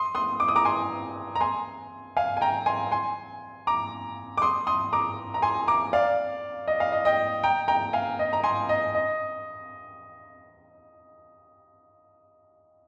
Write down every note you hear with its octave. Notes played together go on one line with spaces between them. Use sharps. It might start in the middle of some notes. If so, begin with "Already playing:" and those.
Already playing: C6 D#6
C6 D#6
D6
D#6
A#5 D6
G#5 C6
A#5
G#5 C6
F5 G#5
G#5
G5 A#5
G#5 C6
G#5 C6
A#5 D6
D6
C6 D#6
C6 D#6
A#5 D6
A#5
G#5 C6
A#5 D6
D5 F5
D#5
F5
D#5
D#5 G5
G5 A#5
G5 A#5
F5 G#5
D#5
A#5
G#5 C6
D#5
D#5